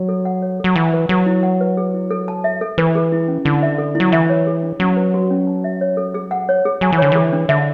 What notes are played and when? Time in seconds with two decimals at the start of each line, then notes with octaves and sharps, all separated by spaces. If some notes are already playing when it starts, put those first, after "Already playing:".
Already playing: F#3
0.09 A4
0.25 F#5
0.42 C#5
0.60 F#3 A4
0.76 E3 F#5
0.93 B4
1.09 F#3 G#4
1.26 E4
1.43 F#5
1.61 B4
1.77 G#4
1.94 E4
2.11 A4
2.28 A5
2.44 E5
2.61 A4
2.78 E3 B4
2.95 G#4
3.12 E4
3.28 C#4
3.45 D3 E4
3.63 E5
3.78 A4
3.95 F#3 E4
4.12 E3 E5
4.30 C#5
4.47 G#4
4.63 D4
4.80 F#3 C#4
4.97 B4
5.14 F#4
5.30 C#4
5.47 A5
5.64 E5
5.81 C#5
5.97 A4
6.14 G#4
6.31 F#5
6.49 C#5
6.65 G#4
6.81 F#3 G#5
6.92 E3
6.98 D3 C#5
7.12 E3 G#4
7.33 D4
7.49 D3 E5